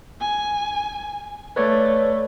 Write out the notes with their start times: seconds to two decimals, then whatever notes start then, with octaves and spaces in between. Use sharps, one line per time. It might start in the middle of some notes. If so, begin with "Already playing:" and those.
0.21 G#5
1.56 A3 B4 C#5 D5